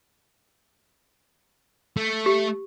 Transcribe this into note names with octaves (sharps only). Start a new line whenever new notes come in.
A3
G4